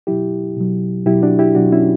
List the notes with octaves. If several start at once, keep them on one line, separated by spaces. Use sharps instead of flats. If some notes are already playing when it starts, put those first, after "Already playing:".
B2 F#3 E4 G4
B2 F#3
B2 F#3 E4 G4
D4 F#4
E4 G4
B2 F#3 D4 F#4
C#4 E4